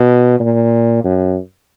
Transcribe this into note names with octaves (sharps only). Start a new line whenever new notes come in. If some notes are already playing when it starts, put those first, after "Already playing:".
Already playing: B2
A#2
F#2